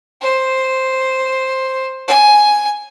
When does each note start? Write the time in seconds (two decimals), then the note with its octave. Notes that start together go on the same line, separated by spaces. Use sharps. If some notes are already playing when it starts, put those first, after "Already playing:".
0.22 C5
2.08 G#5